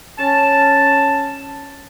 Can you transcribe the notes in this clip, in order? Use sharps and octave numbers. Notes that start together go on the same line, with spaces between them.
C#4 A5